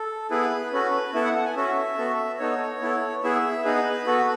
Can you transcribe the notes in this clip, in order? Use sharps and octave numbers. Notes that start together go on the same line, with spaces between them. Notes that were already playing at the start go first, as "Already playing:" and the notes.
Already playing: A4
B3 E4 G#4 B4
C#4 F#4 A4 B4
B3 E4 A4 E5
F#5
F#5
G#5
C#4 F#4 A4 E5
B3 F#4 A4
B3 D#4 A4 C#5
B3 E4 A4
B3 E4 G#4 E5
B3 D#4 G#4 B4
B3 F#4 A4